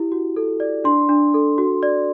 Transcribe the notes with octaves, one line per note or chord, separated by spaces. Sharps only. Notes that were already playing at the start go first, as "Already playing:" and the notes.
Already playing: E4 G4
F#4
A4
D5
D4 C6
D4
A4
F#4
D5